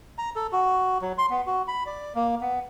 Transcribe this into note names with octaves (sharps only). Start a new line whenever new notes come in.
A#5
A4
F#4
F#3
C6
B3
F#4
B5
D5
A#3
B3